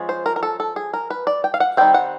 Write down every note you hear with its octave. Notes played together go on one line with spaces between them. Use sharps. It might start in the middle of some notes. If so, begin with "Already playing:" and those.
Already playing: F3 G#3 C#4
C5
A#4
A#4
A4
A4
G#4
A#4
B4
D5
G5
F5
F#5
D#3 G3 C4 G5
F#5